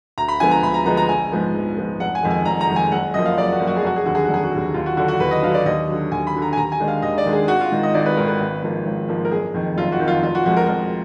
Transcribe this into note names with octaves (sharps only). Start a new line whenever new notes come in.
D2 A#5
B5
D3 F3 G#3 B3 G#5
A#5
D2 B5
A#5
D3 F3 G#3 B3 A#5
A#5
A#1 G#5
G#2 F3 B3
A#1
G#2 F3 B3
F1 F#5
G#5
F2 D#3 G#3
G#5
F1 A#5
A#5
F2 D#3 G#3
G#5
F#1 F#5
F#2 F3 A#3 D#5
F5
F#1 D5
F#4
F#2 F3 A#3
F#4
G#4
F1 F#4
G#4
D#2 D3 F#3 F#4
G#4
F#4
F1 G#4
F#4
D#2 D3 F#3
D#2 F4
F#4
D3 F#3 D4 F#4
F#4
D#2 B4
D#5
D3 F#3 D4 F5
D5
D#2 D#5
D3 F#3
D#2 G#5
B5
D3 F#3
A#5
G#5
D#2 A#5
G#5
D#3 G#3 D4
F5
D#2 D#5
D5
D#3 G#3 D4
G#4
G#1 F#4
F4
G#2 D#3
D#5
G#1 D5
B4
G#2 D#3 A#4
B4
G#1
G#2 F3 A#3
G#1
G#2 F3 A#3
A#4
F#1 G#4
F2 D#3
F#1 F4
F#4
F2 D#3
F4
F1 F4
F#4
F2 F3 G#3 F#4
A#4
F1 A#4